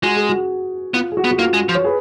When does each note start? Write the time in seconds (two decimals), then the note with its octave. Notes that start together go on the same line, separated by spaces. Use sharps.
0.03 G#3 F#4
0.16 G#4
0.29 F#4
0.94 B3 F4
1.12 G#4
1.17 F#4
1.24 B3
1.31 F#4
1.39 A#3 F4
1.54 G#3
1.69 F3
1.75 C#5
1.84 G#4 B4